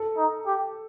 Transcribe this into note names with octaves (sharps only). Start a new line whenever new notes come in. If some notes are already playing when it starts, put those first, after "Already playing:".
Already playing: A4
D#4
G4